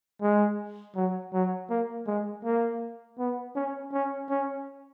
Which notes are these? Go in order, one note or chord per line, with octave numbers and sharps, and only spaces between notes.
G#3
F#3
F#3
A#3
G#3
A#3
B3
C#4
C#4
C#4